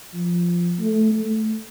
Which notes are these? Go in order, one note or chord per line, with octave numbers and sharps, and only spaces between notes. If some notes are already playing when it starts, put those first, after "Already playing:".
F3
A3
A3